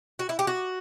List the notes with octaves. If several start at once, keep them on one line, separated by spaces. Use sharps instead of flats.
F#4
E4
G4
F#4